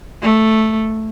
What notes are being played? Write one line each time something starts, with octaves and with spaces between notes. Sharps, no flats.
A3